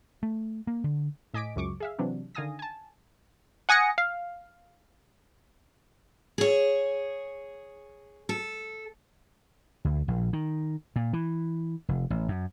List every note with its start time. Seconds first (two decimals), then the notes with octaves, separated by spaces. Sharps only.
0.23 A3
0.67 A#3
0.84 D3
1.34 A2 D#5 G#5 D6 B6 D7
1.56 C#2 F#2 C#6 D6
1.80 G#4 E5 F5
1.99 C3 E3 F#3 D4
2.35 D3 D#3 F5 G#5 D#6 A#6
2.59 G#5 A5
3.69 F#5 G#5 D#6 A#6 C#7
3.98 F5
6.38 G#4 C#5
8.29 A4
9.85 D2
10.08 A#1
10.33 D#3
10.96 A#2
11.13 E3
11.89 F1
12.10 A1
12.28 F#2